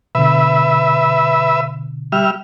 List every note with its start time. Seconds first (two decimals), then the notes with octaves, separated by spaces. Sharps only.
0.15 B2 D3 B4 E5
2.12 G3 E5 F6